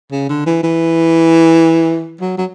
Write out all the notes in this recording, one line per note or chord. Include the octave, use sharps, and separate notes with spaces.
C#3
D3
E3
E3
F#3
F#3